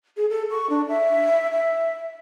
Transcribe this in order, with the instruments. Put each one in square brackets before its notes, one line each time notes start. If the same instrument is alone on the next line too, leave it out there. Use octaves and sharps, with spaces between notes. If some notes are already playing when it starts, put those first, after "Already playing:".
[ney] G#4
A4
C#6
D4
E5
E5